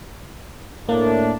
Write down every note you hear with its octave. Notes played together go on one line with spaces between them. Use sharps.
A2 A3 A#3 D4